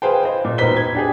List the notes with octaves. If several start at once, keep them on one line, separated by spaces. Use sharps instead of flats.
G#4 B4 C5 F5 G5
C5 D#5
A#2
E1 D#4 B4 C5 B6 G7
G#6
D4 G4 G#4